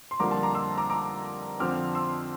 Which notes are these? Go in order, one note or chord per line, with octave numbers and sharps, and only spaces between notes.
C6
F2 D3 G3 A#3 A#5 D6
A5 C6
A#5 D6
C6 E6
A#5 D6
A#5 D6
F2 D3 F3 C4 D6 F6
C6 E6